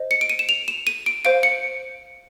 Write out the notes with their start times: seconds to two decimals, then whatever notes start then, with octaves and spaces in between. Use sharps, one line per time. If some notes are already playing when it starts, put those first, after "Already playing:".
Already playing: C5 D#5
0.11 C#7
0.21 D7
0.30 D#7
0.39 E7
0.49 F7
0.68 E7
0.87 D#7
1.06 D7
1.25 C5 F5 D7
1.43 C#7